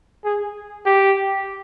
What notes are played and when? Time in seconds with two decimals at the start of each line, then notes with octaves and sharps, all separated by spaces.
0.25 G#4
0.85 G4